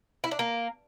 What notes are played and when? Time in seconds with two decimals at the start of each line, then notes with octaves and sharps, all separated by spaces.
0.24 E4
0.31 D4
0.39 A#3